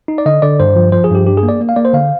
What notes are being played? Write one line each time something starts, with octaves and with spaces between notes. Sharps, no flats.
D#4
D5
D3 D#5
D3 D5
G2 C5
F3
F3 C5
G#4
G2 G4
D4 G4
G#4
A#3
D5
A#3
F5
A#3 D5
C5
D3 F5